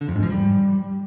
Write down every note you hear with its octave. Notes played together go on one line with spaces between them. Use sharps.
D3
F2
G#2
F3
G3